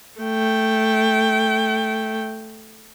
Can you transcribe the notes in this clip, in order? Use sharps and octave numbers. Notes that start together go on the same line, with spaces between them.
A3 G5